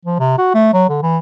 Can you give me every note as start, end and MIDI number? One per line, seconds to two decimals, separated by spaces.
0.05 0.19 53
0.19 0.38 48
0.38 0.52 66
0.54 0.72 57
0.73 0.89 54
0.89 1.02 50
1.02 1.18 52